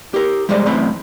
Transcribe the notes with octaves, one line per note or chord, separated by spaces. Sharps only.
G4 A#4
G3 G#3 C5 D5 D#5
F#2 E3 A3 C4 D#5 B5